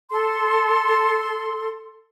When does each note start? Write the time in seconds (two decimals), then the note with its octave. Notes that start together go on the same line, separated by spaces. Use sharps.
0.11 A4 C6